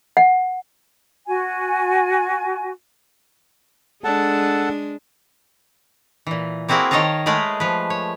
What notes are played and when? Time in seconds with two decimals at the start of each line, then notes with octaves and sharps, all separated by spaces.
0.17 F#5
1.28 F#4 G#5
4.04 G#3 D4 A4 F#5 A5
6.27 A#2 E3
6.68 A#3 C4 E4 F#4 G#4 A#4
6.91 D#3 C#5 D#5 F5 A5 A#5
7.26 G#3 A3 G#4 A#4 B4 F5
7.60 F3 B4
7.90 C#5